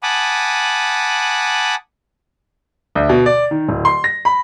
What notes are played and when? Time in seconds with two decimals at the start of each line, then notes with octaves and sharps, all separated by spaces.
0.03 F#5 G#5 A5 B5 D6 D#6
2.95 D2
3.09 B2
3.26 D5
3.51 D#3
3.69 D1
3.85 C6
4.04 A#6
4.25 B5